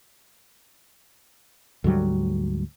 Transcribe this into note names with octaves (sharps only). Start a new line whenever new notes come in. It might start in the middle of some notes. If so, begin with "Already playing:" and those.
D2 G#2 F#3 G3